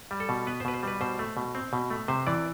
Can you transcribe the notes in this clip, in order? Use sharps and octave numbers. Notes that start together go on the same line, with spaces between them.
G3
A4
B2
B3 B4
C5
B2 B4
C5
G3 B4
B2 C5
A3
B2
C4
B2
A3
C3 C5
E3 D5